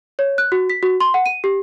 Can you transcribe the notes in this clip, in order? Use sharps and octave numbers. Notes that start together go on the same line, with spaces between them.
C#5
F#6
F#4
B6
F#4
C6
F#5
D#7
G4